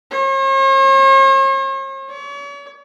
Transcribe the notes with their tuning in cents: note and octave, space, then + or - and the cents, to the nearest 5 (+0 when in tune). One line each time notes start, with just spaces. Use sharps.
C#5 -45
C#5 +40